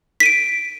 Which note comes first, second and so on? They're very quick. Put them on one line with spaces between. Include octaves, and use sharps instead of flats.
B6 D#7 D7